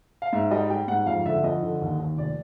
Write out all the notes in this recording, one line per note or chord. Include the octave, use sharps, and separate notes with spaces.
F5
G#2 E5
G3 D#5
G3 G5
G#2 F#5
F2 F5
D3 E5
F2 D#5
D3
D#2
D#2
F1 D5